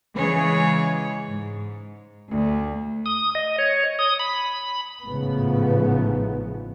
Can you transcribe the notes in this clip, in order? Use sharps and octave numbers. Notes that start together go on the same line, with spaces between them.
C#3 E3 G#3 G#4 C#5
G#2
D2
D#6
D#5
C#5
D#6
B5
A1 G#2 C#3 F3 A3 B3